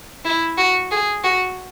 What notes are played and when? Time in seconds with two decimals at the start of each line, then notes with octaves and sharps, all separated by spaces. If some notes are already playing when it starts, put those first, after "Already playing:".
0.25 E4
0.58 F#4
0.91 G#4
1.24 F#4